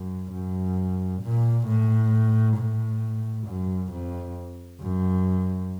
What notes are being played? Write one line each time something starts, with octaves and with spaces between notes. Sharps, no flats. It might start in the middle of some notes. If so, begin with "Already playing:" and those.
Already playing: F#2
F#2
A#2
A2
A2
F#2
F2
F#2